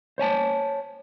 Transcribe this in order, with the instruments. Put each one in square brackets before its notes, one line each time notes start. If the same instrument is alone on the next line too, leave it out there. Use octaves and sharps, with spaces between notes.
[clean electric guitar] C5 C#5 G#5 A5